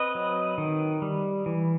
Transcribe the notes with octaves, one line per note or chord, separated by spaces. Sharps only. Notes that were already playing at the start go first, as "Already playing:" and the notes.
Already playing: C4 B4 D#5
F#3
D#3
G3
E3